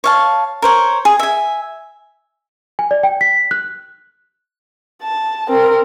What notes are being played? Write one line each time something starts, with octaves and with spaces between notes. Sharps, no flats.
C#5 F5 A5
A#4 C5 C#5
G#4
E5 G#5
G#5
D5
G5
B6
F#6
A5
C4 A#4